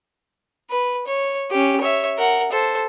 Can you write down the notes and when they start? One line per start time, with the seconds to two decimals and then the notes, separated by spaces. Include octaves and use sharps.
0.70 B4
1.07 C#5
1.51 C#4 G4
1.81 C#5 E5
2.18 A#4 F#5
2.51 A4 C5